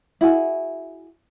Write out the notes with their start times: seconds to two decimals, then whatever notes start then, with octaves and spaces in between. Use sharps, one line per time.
0.21 E4 F#4 G#4